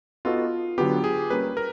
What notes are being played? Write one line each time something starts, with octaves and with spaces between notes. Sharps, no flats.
B3 D#4 F4 F#4 A4
D3 F#3 B3 G4
G#4
G3 A#3 C#4 B4
A#4